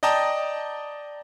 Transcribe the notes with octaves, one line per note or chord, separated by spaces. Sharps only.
D5 D#5 G5 A5 A#5 D#6